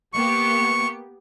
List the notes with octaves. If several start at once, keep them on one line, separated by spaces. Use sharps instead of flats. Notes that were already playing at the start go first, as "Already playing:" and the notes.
A#3 B3 G4 C#6